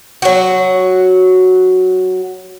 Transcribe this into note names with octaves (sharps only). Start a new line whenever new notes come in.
F#3 F#4